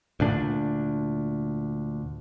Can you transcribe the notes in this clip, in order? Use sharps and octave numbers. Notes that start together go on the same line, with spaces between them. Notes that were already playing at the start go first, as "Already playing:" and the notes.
D2 A#2 D4